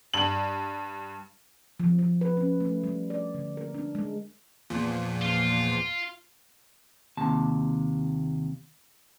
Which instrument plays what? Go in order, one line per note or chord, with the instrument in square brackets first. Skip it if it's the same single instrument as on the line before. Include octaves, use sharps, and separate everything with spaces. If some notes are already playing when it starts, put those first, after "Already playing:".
[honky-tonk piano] G2 F#7
[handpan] F3
F3
B4
C#4
A3
G3
D5
D3
A#4
D4
G#3
[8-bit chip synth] E2 A#2 F3
[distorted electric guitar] F4 F5
[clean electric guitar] D#2 C3 A5